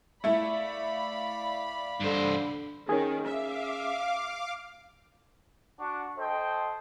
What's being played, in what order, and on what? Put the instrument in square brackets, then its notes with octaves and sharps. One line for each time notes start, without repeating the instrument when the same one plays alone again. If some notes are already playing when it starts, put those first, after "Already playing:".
[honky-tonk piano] A3 E4 [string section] D5 F5 B5
[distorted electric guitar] G2 C5 [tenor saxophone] D3
[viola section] D#3 [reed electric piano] C#4 G#4
[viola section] E5 [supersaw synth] F5 D6
[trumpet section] D4 F#4 F#5 C#6
A4 C5 D#5 G5